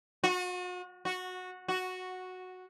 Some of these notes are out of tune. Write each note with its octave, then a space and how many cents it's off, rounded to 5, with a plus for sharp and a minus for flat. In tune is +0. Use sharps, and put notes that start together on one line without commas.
F#4 -40
F#4 -15
F#4 -5